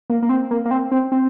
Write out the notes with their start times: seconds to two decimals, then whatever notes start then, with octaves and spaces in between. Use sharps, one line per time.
0.10 A#3
0.22 A#3
0.29 C4
0.51 A#3
0.65 A#3
0.71 C4
0.92 C4
1.12 C4